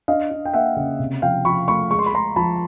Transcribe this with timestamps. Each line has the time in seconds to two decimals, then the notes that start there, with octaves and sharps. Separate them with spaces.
0.08 D4 D#5 F5
0.31 D4
0.45 G5
0.54 A#3 E5 F#5
0.76 C#3
0.99 C3
1.22 F3 F5 G5
1.45 F3 B5 C#6
1.68 A3 B5 C#6
1.91 G#3 C#6
1.99 C6
2.06 B5
2.13 G#3 A#5 C6
2.36 F3 A5 B5